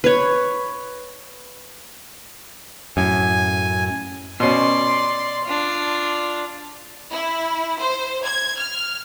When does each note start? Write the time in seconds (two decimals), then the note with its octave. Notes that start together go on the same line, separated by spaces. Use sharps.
0.04 B4 C#5
2.97 F#2 A2 G#5
4.40 B2 C#4 D5 C6
5.45 D4 F4
7.12 E4
7.80 C5
8.25 G#6
8.58 F6